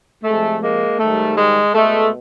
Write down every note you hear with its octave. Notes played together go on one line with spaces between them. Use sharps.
C3 F3 G#3 A3
G#3 A#3
G#2 D#3 G3 A3
G#3
B2 G#3 A3